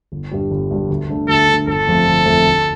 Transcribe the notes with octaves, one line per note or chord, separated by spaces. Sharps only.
G1
G2 G3
G1
G2 G3
D2
D3 A3
D2 A4
D3 A3
G1 A4
F2 F3 A3
G1
F2 F3 A3
D2